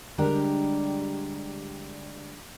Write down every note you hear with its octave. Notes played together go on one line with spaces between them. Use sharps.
D3 G3 G#3 D4 G4 A#4